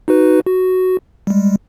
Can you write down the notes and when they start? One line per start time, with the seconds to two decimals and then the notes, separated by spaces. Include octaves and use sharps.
0.08 D#4 F#4 B4
0.46 F#4
1.27 G3 G#3